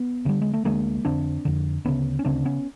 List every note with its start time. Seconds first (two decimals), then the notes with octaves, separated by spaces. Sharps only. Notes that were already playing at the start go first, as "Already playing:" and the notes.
Already playing: B3
0.25 D2 D3 G3
0.42 G#3
0.54 A3
0.65 D2 D3 G#3 A#3
1.05 F2 D3 C4 D4
1.45 F2 D3
1.85 D2 C#3 B3 C#4
2.19 C#4
2.25 D2 C#3 C4 D4
2.45 B3 C#4